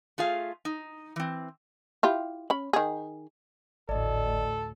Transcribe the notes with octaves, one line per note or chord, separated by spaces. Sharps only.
A3 F4 G#4 F5
D#4
E3 C4
E4 F4 G4
C#4 B5
D#3 G#4
G#1 D2 A2 A4 D5 D#5